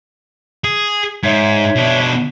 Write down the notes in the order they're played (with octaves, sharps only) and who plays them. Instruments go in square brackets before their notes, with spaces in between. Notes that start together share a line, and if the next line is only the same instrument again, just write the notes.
[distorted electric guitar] G#4
[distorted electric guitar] G#2 [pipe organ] C#5 E5
[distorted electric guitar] B2 D4